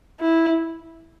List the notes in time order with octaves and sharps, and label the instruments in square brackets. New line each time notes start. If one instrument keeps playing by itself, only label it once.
[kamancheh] E4